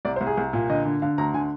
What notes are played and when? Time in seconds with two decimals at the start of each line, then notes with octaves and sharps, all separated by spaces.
0.05 C2 D5
0.16 C5
0.21 C2
0.27 G#4
0.38 C2
0.53 A#2
0.70 D3 D#5
0.85 D3
1.02 D3 F5
1.18 D2 A#5
1.34 D3 G#5